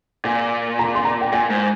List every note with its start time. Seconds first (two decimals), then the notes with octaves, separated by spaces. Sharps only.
0.25 A#2 G#5
0.79 A#5
0.95 C6
1.05 A#5
1.21 G5
1.32 A#2 G#5
1.50 G#2